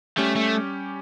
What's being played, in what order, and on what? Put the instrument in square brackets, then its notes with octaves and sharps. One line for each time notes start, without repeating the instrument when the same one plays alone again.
[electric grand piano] G3 C#4 G4 [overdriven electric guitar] A3
[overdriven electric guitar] A3